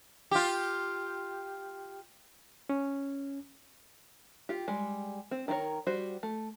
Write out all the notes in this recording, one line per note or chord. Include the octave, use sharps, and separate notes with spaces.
F4 G4
C#4
F4 G4
G3 G#3
C4
D#3 D4 F4 A#4 C#5
G3 F#4 C5
A3